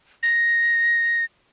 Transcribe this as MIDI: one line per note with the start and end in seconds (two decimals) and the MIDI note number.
0.23 1.25 94